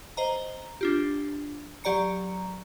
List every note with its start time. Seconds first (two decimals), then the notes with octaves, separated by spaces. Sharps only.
0.17 C5 D#5 A#5
0.81 D4 F4 G4
1.84 F#3 G4 D5 A#5 C#7